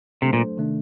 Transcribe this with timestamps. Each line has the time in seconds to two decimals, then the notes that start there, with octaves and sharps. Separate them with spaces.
0.22 C3 F#3 A3 D4 A4 C5
0.33 A#2
0.57 C3 D#3 A3 D4